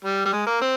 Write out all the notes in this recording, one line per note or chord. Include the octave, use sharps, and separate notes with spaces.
G3
G3
G#3
A#3
C4